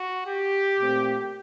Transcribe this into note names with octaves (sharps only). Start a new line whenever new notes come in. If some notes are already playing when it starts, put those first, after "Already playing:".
Already playing: F#4
G4
A#2 A3 C4